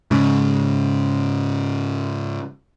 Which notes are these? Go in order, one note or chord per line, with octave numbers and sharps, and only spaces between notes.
G#2 C#3